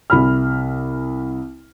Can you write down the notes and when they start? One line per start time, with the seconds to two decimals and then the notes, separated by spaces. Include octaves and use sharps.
0.10 C2 B5 F6